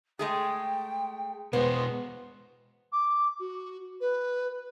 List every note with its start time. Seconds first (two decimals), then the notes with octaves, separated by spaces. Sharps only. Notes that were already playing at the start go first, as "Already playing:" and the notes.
0.19 G#3 A3 G#4 G5
1.53 B2 G#3 B3 C5
2.92 D6
3.40 F#4
4.01 B4